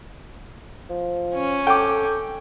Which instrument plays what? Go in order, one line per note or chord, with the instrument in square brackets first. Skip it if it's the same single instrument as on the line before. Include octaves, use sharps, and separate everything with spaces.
[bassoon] F3
[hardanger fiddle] C#4
[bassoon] A4 [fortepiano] G5 D6